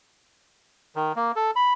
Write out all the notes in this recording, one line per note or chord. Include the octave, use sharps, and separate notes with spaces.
D#3
A#3
A4
B5